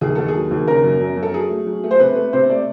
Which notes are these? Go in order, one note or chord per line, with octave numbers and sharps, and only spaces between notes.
D#2 G#4
D#2 A4
G#4
F#3
D#2
C#3 A#4
F#2
F#2
F#2
A4
F#3 G#4
A3
F#3
A3
C5
C3 B4
A3
C3 C5
A3 D5